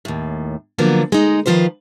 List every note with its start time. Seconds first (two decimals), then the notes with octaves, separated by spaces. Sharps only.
0.05 D#2 A2
0.78 D3 F3 F#3 A#3 B3
1.12 G#3 D#4
1.46 D#3 F3 F4 B4 C5